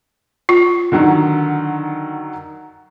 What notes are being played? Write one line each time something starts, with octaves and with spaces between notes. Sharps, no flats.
F4
D3 D#3 F#3